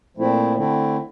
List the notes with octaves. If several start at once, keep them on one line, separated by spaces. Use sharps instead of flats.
A#2 F3 A3 C4 E4
D3 A3 C4 E4